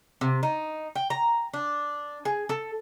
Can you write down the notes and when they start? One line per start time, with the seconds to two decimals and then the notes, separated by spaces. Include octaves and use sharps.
0.21 C3
0.43 D#4
0.95 G5
1.10 A#5
1.54 D4
2.25 G#4
2.49 A4